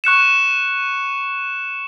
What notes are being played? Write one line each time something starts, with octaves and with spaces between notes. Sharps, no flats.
C#6 F#6 C#7 E7